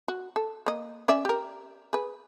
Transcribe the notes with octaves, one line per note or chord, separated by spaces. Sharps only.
F#4
A4
A#3 D#5
C#4 D5 E5
G4 A#4
G#4 B4